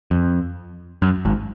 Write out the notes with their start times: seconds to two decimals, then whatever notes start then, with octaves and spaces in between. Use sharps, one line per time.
0.11 F2
1.02 F#2
1.25 G#1 G#2